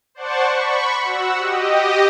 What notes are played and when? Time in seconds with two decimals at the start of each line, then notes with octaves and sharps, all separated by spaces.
0.15 C5 D5 F#5 A5 C#6
0.48 B5 C#6
1.04 F#4 F#5 E6
1.38 G4 D#5